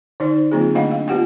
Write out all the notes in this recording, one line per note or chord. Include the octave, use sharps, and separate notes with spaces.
D3 D#4 C5 D5
D3 F#3 A#3 C4 F4 G#4
D3 A3 D4 D#5 F5 F#5
F5
B3 F4 G4 F#5 G5